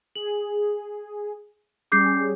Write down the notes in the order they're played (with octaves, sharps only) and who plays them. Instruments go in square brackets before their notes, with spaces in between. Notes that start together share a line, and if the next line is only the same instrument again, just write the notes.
[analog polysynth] G#4 [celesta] F#7
[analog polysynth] G3 C#4 G#4 [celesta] D6 G6 C7